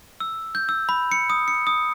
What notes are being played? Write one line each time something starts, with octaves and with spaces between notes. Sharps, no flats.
E6
G6
E6
B5
C#7
D#6
C#7
D#6